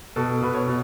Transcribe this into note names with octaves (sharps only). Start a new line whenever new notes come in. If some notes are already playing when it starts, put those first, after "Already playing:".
B2 A4
B2 B4
C#5
B2